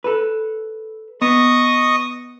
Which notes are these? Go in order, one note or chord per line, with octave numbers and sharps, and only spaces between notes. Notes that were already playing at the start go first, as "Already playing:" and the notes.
A4 B4
B3 D#5 C#6 D#6